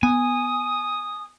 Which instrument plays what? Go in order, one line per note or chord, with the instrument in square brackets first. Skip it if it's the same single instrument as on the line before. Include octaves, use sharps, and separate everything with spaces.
[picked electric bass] B3 [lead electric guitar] G#5 [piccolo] D#6